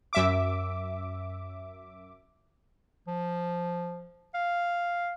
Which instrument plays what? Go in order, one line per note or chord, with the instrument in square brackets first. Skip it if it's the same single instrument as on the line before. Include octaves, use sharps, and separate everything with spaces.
[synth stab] F#2 E5 D6
[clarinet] F3
F5